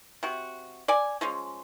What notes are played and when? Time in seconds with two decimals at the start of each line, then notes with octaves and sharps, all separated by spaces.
0.23 C3 F#4
0.88 D5 G#5
1.21 F3 G#3 C#4